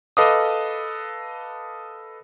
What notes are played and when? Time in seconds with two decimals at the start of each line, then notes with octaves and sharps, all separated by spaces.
0.17 A4 B4 D#5 F5 D6 D#6